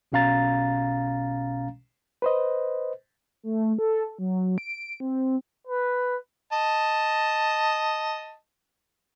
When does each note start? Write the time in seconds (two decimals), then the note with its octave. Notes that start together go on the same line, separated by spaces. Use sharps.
0.12 B1 B2 C#4 F5 A#5 A6
2.22 B4 C5 D#5
3.43 A3
3.79 A4
4.18 F#3
4.58 D7
5.00 C4
5.67 B4
6.52 D#5 A5